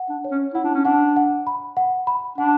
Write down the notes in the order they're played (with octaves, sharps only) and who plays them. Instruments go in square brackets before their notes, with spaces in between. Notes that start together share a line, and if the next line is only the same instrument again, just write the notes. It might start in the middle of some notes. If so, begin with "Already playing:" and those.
Already playing: [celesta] F#5
[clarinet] D4
[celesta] C#5
[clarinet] C#4
[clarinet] E4 [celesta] F#5
[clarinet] D4
C#4
[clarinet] D4 [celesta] F#5
[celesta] F#5
B5
F#5
B5
[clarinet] D4 [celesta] F#5